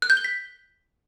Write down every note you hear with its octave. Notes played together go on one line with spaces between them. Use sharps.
F#6
G6
G7
B6